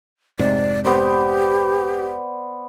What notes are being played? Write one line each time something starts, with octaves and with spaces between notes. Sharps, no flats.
F1 G#2 C3 D5
B3 G4 C5 D5